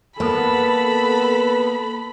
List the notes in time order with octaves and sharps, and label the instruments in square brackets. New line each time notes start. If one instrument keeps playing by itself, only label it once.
[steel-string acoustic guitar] A#3 [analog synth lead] B3 [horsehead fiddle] A4 [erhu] B5